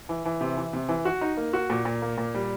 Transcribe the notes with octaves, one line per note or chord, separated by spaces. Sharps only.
E3
E3
C3
E3
C3
E3
F#4
D#4
A#3
F#4
A#2
A#2
A#3
A#2
G3